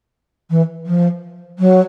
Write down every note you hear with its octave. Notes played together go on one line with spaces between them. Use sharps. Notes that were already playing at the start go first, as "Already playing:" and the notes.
E3
F3
F#3